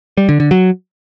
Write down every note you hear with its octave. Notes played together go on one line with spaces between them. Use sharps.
G3
D3
D3
F#3